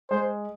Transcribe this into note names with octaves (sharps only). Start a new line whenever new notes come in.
G#3 C5